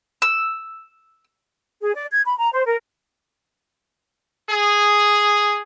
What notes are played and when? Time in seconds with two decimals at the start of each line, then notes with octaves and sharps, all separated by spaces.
0.22 E6
1.81 G#4
1.95 D5
2.11 G#6
2.25 B5
2.38 A#5
2.52 C5
2.66 A#4
4.49 G#4